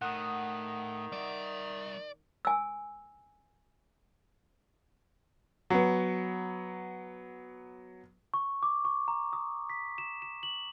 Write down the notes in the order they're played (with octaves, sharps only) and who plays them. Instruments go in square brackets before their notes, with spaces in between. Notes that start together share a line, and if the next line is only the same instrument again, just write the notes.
[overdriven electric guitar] A2 [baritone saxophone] D#3 [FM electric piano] F#5 D#6
[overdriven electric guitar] G3 E5 [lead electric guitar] D5
[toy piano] G#5 E6
[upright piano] F#3 B3
[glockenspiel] C#6
D6
C#6
A#5
D#6
B6
E7
E7
F#7